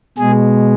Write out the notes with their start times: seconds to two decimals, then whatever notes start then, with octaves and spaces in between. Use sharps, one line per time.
0.18 B2 G#3 G#4